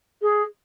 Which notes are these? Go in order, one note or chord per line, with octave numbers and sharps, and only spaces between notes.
G#4